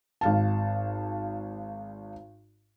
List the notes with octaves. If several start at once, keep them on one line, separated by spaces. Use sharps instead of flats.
G#1 F5 A5